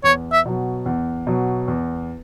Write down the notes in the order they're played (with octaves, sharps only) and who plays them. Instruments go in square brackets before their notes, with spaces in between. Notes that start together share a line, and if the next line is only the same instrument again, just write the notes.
[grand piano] E2 [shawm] C#5
[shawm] E5
[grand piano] B2 F#3
E2
B2 F#3
E2